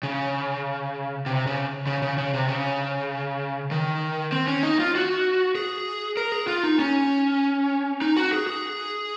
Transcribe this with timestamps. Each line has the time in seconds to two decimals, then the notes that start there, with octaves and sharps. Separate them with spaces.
0.03 C#3
1.26 C3
1.47 C#3
1.87 C#3
2.02 C#3
2.18 C#3
2.33 C3
2.48 C#3
3.71 D#3
4.32 C4
4.48 C#4
4.63 D#4
4.79 F4
4.95 F#4
5.55 G#4
6.17 A#4
6.32 G#4
6.47 F4
6.63 D#4
6.79 C#4
8.02 D#4
8.17 F#4
8.32 G#4
8.47 G#4